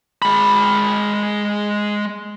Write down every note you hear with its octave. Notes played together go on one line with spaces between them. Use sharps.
G#3 B5